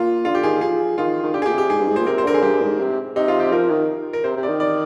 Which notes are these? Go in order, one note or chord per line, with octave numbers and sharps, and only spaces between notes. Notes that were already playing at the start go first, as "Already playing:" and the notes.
Already playing: A#2 F4
D3 F4
G4
D#3 G#4
F3 G#4
D#3 F4
D#3
D3 G4
G#4
A#2 G4
C3
G4
G#2 G#4
G2
G#2
A#2 C5
C3 A#4
C5
D3 A#4
G#4
G2 G4
G#2
C3
C3 D#4
F4
G4
F3 A#4
D#3
A#4
C3 C5
C3
D5
D#3
D5